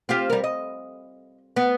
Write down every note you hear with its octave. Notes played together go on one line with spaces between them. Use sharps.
C4 F4 G4
G3 A#4
D#5
B3